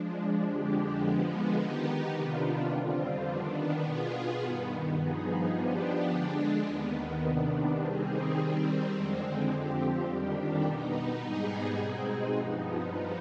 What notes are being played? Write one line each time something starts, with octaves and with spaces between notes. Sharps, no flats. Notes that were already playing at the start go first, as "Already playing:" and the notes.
Already playing: F3 G#3 D4
F2 D3 G#3 D4 G4
D3 F3 G#3 B3
D#3 B3 D#4 G4
C3 D#3 B3 D4 F4
F2 D3 G3 C4 F4
D#3 B3 D4
B2 B3 F4 G#4
G2 D#3 B3
G2 F3 B3 D#4 G#4
F3 B3 D4 G4
D3 G#3 D4
D#2 D#3 B3
C3 D#3 B3 D4
D#3 G3 C4 D#4 G#4
D#3 G3 C4
F2 D3 G#3 C4
F2 D3 F3 C4 G4
F2 D#3 G3 D4 G4
B2 B3 D#4
G#2 G3 B3 D#4 G#4
B2 G#3 C4 D#4 G#4
G2 F3 B3 D#4